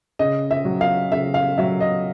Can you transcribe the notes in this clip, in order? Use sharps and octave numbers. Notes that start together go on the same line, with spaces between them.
C#3 D#5
E5
F#3
F5
C#3 E5
F5
F#3 E5
D#5